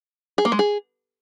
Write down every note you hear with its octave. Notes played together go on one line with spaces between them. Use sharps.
G#4
A#3
G#3
G#4